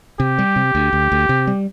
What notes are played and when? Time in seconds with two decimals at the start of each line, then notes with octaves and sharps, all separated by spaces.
0.20 C3 G4
0.38 G3
0.56 C3
0.75 D2
0.93 D2
1.12 D2
1.29 C3
1.47 G3